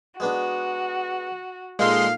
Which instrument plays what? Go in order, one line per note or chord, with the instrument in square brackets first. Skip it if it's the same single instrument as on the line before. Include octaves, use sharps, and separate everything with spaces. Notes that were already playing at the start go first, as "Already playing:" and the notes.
[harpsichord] G#3 B3 D4 [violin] F#4
[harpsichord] A#2 D#4 A4 [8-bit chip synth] G#3 C6 [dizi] F5